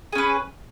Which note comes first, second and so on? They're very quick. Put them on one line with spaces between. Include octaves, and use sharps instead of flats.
G#4 C#4 B4